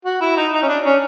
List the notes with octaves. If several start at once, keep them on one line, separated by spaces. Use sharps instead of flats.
F#4
E4
D#4
D#4
C#4
D4
C#4